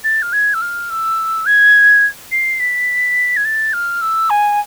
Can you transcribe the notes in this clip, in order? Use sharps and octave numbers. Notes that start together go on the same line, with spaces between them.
A6
F6
G#6
E6
F6
E6
G#6
C7
B6
G#6
A6
F6
E6
G#5